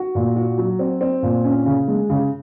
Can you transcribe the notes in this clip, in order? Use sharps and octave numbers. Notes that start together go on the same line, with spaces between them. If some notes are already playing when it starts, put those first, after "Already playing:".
Already playing: F#4
A#2
F#4
F#3
C4
C4
A#2
C#4
C#3
G#3
C#3